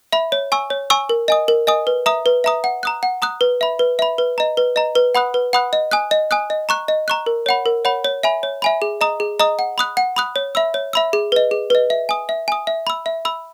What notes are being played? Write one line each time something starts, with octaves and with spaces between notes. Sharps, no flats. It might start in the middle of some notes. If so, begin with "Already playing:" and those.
E5 B5
C#5
G#5 C#6 E6
C#5
G#5 C#6 E6
A#4
D#5 G#5 D#6
A#4
D#5 G#5 D#6
B4
E5 A#5 D#6
B4
E5 A#5 D#6
F#5
A#5 D#6 F#6
F#5
A#5 D#6 F#6
B4
E5 B5
B4
E5 B5
B4
D#5 A#5
B4
D#5 A#5
B4
F#5 B5 D#6 F#6
B4
F#5 B5 D#6 F#6
D#5
G#5 D#6 F#6
D#5
G#5 D#6 F#6
D#5
A#5 C#6 F#6
D#5
A#5 C#6 F#6
A#4
C#5 F#5 B5
A#4
C#5 F#5 B5
C#5
E5 G#5 B5
C#5
E5 G#5 B5
G#4
D#5 A#5 D#6
G#4
D#5 A#5 D#6
F#5
B5 D#6 F#6
F#5
B5 D#6 F#6
C#5
E5 B5 E6
C#5
E5 B5 E6
G#4
B4 D#5
G#4
B4 D#5
E5
G#5 D#6
E5
G#5 D#6
E5
B5 E6
E5
B5 E6